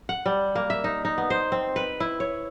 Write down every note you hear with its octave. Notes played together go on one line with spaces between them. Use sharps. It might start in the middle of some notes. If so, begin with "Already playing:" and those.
F#5
G3
A#3
E5
D#4
D#4
B3
C5
C4
B4
E4
C#5